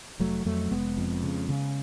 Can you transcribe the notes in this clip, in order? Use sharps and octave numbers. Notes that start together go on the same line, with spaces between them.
F1 F#3 A3
F2 F#3 A3
F1 G#3 B3
F2
C#3
C#3